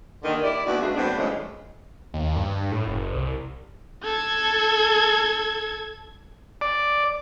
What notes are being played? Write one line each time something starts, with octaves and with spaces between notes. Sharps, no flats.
D#2 D3 D#3
E4 G4 D5
D#2 D3 B3 F#4
C#3 G#3 A3 D4 F#4
A2 F#3 B3 C4 D4
G2 C#3 F3 G#3 A3
D#2
G2
A2
F#1
C2
A4 G#6
D5